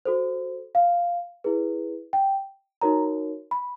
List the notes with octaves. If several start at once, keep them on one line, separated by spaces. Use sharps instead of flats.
F#4 A4 C5
F5
E4 G#4 B4
G5
D#4 F#4 A#4 C#5 A#5
B5